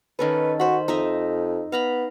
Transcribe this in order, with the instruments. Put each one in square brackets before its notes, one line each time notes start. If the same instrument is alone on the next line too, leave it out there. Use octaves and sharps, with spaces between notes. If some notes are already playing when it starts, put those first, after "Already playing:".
[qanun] D#3 C#4 A4 [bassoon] B4
[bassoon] F#4 [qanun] C5 B5
[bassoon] F2 [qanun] D#4 D#5 E5
[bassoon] B3 [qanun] F5 A#5 B5